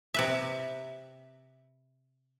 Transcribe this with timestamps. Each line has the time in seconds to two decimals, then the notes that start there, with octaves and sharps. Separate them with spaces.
0.14 C3 B4 E5